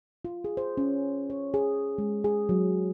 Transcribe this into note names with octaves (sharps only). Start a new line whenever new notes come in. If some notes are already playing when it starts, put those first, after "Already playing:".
F4
G#4
C5
C#4
C#5
G#4
G#3
G#4
F#3